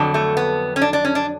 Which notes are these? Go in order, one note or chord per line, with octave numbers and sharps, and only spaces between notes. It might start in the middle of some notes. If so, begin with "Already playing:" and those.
Already playing: F2 D3 F#3
A3
B3
C#4
D4
D4
C#4
D4